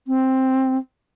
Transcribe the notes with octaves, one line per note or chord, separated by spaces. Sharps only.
C4